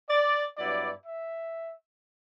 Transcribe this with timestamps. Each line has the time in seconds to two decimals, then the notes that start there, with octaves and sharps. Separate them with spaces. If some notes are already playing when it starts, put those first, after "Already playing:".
0.10 D5
0.58 G2 F#3 B3 E4 D5
1.05 E5